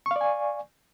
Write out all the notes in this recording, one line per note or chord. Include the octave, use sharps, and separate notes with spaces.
D5 F5 G#5 C#6